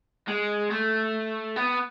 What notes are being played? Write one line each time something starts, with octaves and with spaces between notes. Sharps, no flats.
G#3
A3
B3